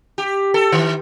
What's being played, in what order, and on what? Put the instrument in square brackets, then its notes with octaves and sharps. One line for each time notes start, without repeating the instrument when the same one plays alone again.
[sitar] G4
A4
D#3